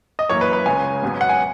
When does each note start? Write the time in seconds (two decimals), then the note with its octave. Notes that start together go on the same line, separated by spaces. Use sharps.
0.19 D#5
0.29 F#2 E3 A#3 C#5
0.41 B4
0.53 B4
0.66 C#2 C#3 G#3 C#4 G#5
1.02 G#1 G#2 F#3 B3
1.21 F#5
1.29 G#5